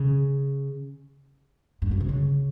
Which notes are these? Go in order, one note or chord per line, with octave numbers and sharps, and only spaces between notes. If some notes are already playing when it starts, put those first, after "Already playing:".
Already playing: C#3
G2
A2
B2
C#3